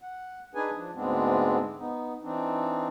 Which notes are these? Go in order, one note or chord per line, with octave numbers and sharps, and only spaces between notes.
F#5
D4 D#4 G#4 B4 G#5
F3 D4
D2 G#2 G#3 B3 C4 D4
B3 D#4
E3 C4 D4 D#4